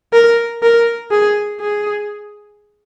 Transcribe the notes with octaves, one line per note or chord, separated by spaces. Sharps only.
A#4
A#4
G#4
G#4